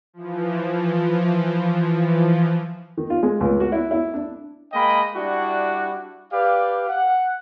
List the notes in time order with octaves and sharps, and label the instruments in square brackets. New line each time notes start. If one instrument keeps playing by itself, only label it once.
[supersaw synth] E3 F3
[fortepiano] D#3
F4
G#3
C#2
F#4
E4
E4
D4
[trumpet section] G#3 A#3 D#5 G5 B5
G3 D4 E4 F#4
G4 B4 D5 F5
F#5